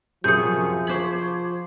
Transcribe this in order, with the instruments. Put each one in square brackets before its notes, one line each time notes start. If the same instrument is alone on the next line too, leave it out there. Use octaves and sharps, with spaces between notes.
[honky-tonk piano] F#2 C3 [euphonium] F3 [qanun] G#4 C#6 [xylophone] D#6 G6
[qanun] C5 B5 [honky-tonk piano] C#6 D6 G#6